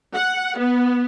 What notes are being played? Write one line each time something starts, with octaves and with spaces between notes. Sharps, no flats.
F#5
B3